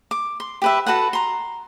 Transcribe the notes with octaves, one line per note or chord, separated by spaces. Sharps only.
D6
C6
G4 B4 E5
F#4 A4 B4 F#5
A#5 C6